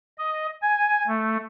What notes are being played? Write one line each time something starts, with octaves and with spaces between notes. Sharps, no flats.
D#5
G#5
A3